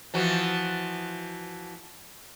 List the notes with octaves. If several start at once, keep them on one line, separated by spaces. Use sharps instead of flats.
E3 F3 F#4